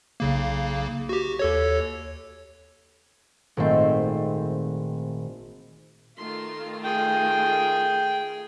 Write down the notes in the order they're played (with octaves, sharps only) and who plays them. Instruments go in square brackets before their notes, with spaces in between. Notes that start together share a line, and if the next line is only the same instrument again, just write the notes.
[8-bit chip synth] B1 C#3 A#3
F#4 G4
D#2 A4 C#5
[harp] G#1 A#2 A3 C4
[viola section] D#3 A3 F4 [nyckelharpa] C6
[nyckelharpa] G#4 [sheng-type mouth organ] G5